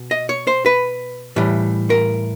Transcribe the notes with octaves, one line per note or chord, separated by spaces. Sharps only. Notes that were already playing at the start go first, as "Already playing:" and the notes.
Already playing: B2
D#5
C#5
C5
B4
A2 E3 G3
A#4